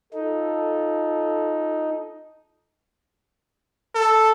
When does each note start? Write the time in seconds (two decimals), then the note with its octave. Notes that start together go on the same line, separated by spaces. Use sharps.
0.13 D#4 F4 A4
3.95 A4